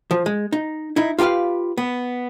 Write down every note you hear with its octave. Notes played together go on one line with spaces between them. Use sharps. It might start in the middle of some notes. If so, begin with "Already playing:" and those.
F3
G#3
D#4
D#4 E4
F4 G4 A4 B4 F5
B3